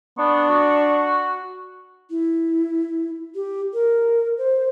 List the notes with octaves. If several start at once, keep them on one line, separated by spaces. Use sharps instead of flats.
B3 D4 C#6
F#4
E4
G4
A#4
C5